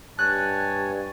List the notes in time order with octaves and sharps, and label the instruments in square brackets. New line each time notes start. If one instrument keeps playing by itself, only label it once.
[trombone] G2 [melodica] C#5 G#5 [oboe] A5 [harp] F#6